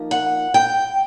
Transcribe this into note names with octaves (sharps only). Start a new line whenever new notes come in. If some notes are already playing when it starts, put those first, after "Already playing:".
Already playing: F3 A#3 D#4
F#5
G5